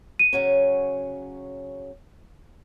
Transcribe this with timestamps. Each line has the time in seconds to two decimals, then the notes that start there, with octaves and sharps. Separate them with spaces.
0.19 D#7
0.33 C#3 F#3 C#4